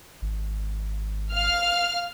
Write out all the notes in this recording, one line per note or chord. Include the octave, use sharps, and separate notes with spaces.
G#1
F5 F6